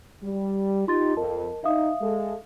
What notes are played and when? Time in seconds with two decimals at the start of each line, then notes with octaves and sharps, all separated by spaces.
0.22 G3
0.87 D#4 F4 G4 C6 A6
1.17 F2 A#4 D#5 A5
1.64 D#4 E5 F5 D#6
2.01 G#3 A4